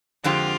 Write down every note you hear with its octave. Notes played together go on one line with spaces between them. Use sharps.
F2 D3 G#3 C4 F4 G4